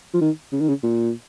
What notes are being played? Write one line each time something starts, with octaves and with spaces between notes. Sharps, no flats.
F3
D#3
C#3
D#3
C#3
A#2